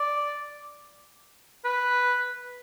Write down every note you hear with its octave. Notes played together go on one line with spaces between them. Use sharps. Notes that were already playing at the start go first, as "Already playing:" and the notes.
Already playing: D5
B4